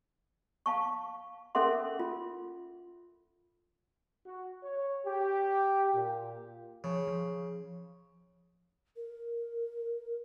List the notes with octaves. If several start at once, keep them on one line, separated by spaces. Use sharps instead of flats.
F5 A5 C#6
C#4 A4 A#4 E5 F#5 C6
F4
F#4
C#5
G4
A#2
C#3 F3
F3
A#4